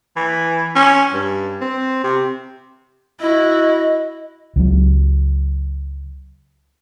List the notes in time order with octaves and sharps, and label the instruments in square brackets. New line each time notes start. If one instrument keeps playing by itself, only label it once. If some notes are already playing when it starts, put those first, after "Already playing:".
[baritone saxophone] E3
C#4
G2
C4
C3
[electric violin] E4 F#4 [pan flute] D#5
[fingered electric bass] C#2 F#3